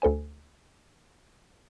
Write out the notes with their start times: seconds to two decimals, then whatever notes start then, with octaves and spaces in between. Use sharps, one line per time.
0.02 D2 A4 C5 G#5